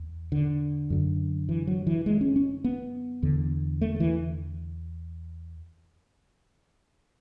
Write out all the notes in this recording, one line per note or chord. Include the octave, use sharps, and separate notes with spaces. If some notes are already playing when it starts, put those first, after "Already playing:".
Already playing: E2
D3
F#2 D3
E3
F#3
E3
G#3
C#4
C#4
B3
E2 D3
A3
E3